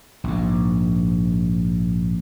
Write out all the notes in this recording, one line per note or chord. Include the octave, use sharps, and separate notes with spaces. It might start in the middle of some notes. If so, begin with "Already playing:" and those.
A#1 G#2